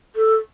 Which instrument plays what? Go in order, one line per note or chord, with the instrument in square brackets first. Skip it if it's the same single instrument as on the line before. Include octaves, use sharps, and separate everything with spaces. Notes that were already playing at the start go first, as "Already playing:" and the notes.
[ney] A4